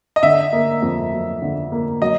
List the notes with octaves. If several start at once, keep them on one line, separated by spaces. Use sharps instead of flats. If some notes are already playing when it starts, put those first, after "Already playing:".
D#5
D3 E5
A#3
F2
F#3
D3
A#3
F#3 D#5